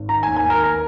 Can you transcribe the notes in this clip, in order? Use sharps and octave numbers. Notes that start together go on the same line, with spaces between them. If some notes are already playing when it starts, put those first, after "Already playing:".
Already playing: G#1
D#3 A#5
G#5
D#2
G#5
D#2
A#4
A#4